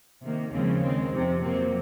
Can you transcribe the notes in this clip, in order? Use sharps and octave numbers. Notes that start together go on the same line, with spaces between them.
C3 D#3 A#3
D#2 C#3 F3 G#3 C4
D#2 D#3 G#3 C4
F2 C3 F3
F2 C3 F#3 A#3 C4